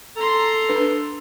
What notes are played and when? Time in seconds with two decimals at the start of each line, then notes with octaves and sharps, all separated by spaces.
0.16 A4 A#5 C6
0.69 D4 B4